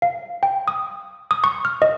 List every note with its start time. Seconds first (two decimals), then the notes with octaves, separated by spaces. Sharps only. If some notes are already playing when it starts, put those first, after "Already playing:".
0.02 F5
0.43 G5
0.68 D#6
1.31 D#6
1.44 C#6
1.65 F6
1.82 D#5